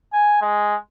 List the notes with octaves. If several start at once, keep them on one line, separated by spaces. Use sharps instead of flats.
G#5
G#3